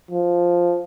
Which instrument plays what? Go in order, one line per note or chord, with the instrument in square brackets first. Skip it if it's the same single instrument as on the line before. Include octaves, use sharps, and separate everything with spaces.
[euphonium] F3